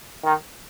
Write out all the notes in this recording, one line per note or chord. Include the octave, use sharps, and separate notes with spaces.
D#3